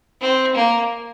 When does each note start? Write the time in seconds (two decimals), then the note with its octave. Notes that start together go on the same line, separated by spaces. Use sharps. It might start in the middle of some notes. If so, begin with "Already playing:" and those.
0.21 C4
0.55 A#3